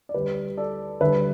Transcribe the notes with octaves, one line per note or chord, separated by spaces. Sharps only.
D5
D2 D3 G3 G4 B4
A4 D5
D2 D3 G3 B4 E5